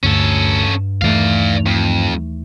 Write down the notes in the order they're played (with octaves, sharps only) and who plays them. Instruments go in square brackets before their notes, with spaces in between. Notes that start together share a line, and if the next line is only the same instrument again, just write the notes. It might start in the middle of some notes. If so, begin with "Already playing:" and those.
[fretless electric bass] D2 [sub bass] G2 [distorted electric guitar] C#4 A4
[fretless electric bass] D#2 E3 A3 [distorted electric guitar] D5 F5
[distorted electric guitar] F2